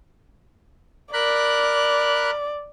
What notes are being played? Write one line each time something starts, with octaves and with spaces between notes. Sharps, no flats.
A#4 D5 B5 F#6